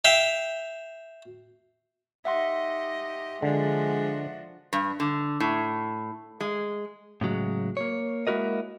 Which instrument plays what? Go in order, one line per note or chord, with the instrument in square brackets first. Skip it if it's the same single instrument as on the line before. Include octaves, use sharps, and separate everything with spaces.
[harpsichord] E5 F5 G5
[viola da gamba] D#4 G4 D#5 [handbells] E5 F#5 C6
[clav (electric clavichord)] D3 [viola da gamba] F3 D4 F#4 [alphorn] G#3
[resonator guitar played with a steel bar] G2
D3
A2
G#3
[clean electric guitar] A2 C#3 F#3 G#3
A#3 C#5
G#3 A#3 E4 F#4 A#4 D#5